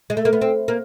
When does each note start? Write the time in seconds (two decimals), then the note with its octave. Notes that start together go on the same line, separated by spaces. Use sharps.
0.10 G#3
0.17 A3
0.25 A#3
0.33 B3
0.41 C4
0.68 A#3